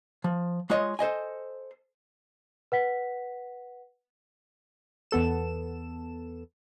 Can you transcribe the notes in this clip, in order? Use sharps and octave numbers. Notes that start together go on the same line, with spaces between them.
F3
G#3 F4 C#5 D#5
A4 C5 D#5 G#5
B4 F#5 B6
E2 B3 A4 E7